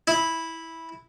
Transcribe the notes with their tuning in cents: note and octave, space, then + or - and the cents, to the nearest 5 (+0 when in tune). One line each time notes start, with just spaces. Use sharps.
E4 -10